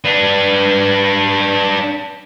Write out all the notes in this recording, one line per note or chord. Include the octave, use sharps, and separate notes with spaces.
D4 B4